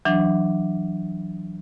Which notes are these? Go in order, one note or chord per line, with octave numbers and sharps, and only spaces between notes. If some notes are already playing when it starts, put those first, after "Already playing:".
E3 F#3 D4